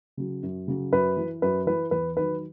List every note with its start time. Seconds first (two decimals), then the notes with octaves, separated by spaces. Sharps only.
0.17 C#3 F#3
0.43 F#2
0.68 C#3 F#3
0.92 F#2 B4
1.17 E3
1.42 F#2 B4
1.67 E3 B4
1.91 E2 B4
2.17 D#3 F#3 B4